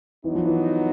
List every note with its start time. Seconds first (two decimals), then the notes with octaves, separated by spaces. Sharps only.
0.24 E3 F#3 B3 D#4
0.35 F3
0.46 E3